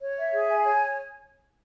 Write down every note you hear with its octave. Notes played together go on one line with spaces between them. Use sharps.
C#5
E5
G#4
G#5
C#5